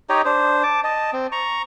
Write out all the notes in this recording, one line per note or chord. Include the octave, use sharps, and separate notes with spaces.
D#4 G4 C#5 D#5
D4 C5
A5 D6
D#5 A5
C4
A#5 C#6